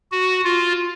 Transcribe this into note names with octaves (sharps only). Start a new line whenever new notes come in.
F#4
F4